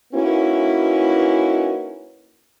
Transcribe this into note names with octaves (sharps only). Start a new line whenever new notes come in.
A#3 C#4 D#4 E4 F#4 B4